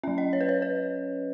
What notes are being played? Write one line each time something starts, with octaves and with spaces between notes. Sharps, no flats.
F#3 C#4 E5
D#5
C#5
B4
C#5
B4